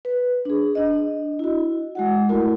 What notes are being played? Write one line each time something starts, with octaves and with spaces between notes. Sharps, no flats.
B4
D4 G#4
D4 D#5
E4 F#4
G#3 F#4 F#5
A3 E4 F#4 A#4